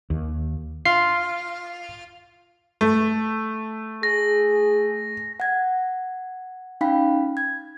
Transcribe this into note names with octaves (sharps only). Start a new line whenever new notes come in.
D#2
F4 C7
A3
G#4 A#6
F#5 G#6
C#4 D#4 F5 G5 B5 B6
G#6